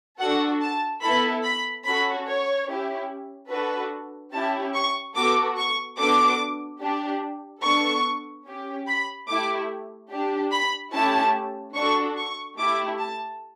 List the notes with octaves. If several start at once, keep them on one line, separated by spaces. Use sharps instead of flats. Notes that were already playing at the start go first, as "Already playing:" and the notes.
D4 F#4 A4 F#5
A5
B3 E4 A4 B5
B5
C#4 F#4 A4 B5
C#5
C#4 E4 G4
D4 F#4 A4 B4
C#4 E4 G4 A5
C#6
B3 F#4 A4 D6
C#6
B3 D4 F#4 A4 D6
D4 G4
B3 D4 A4 C#6
C#4 G4
B5
A3 E4 G4 D6
D4 G4
B5
A3 C#4 E4 G4 A5
D4 F#4 A4 C#6
C#6
A3 E4 G4 D6
A5